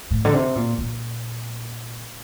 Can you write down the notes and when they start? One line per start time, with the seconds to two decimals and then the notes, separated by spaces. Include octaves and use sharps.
0.11 A2
0.25 D3
0.33 C3
0.55 A#2
0.78 A#2